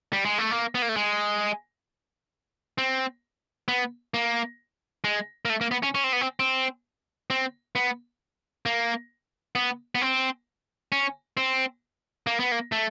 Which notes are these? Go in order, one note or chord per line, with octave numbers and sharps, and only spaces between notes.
G3
G#3
A3
A#3
B3
A#3
A3
G#3
C4
B3
A#3
G#3
A#3
A3
A#3
B3
C#4
C#4
C4
B3
C4
C4
C4
B3
A#3
B3
B3
C4
C#4
C4
A#3
B3
A#3
A3